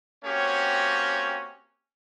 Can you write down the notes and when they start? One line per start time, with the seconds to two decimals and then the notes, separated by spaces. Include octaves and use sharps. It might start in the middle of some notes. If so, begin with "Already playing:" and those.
0.24 A#3 C4 C#4 F#4 G4 C#5